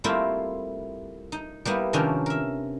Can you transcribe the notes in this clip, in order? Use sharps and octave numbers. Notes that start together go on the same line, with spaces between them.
G3 A3 A#3 C4 E4 F4
D#4
G3 A#3 B3 E4
C3 D#3 F3 A#3 C#4 D4
A#4 E5